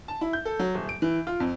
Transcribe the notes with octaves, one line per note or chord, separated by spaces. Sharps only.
A5
E4
G6
A4
F#3
D#1
D7
E3
F4
F2